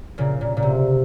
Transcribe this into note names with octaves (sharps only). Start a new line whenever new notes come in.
A#2 C#3
A#2
A#2
C3